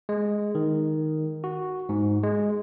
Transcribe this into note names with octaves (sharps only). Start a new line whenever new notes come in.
G#3
D#3
F#4
G#2
G#3